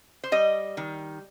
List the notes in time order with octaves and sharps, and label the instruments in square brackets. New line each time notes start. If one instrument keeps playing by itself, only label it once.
[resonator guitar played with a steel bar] C5
G3 D#5
D#3